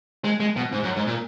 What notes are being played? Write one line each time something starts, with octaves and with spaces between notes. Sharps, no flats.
G#3
G#3
B2
G#2
F#2
G#2
A#2